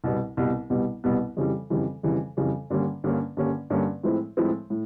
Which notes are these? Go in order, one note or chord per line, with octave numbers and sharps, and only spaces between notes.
C2 B2 G3 B3
C2 B2 G3 B3
C2 B2 G3 B3
C2 B2 G3 B3
F2 C#3 E3 G3
F2 C#3 E3 G3
F2 C#3 E3 G3
F2 C#3 E3 G3
G2 D3 G3 A#3 C#4
G2 D3 G3 A#3 C#4
G2 D3 G3 A#3 C#4
G2 D3 G3 A#3 C#4
A2 F3 G#3 C4 E4
A2 F3 G#3 C4 E4
A2